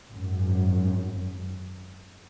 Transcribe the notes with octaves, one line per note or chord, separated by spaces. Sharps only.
G#1 F#2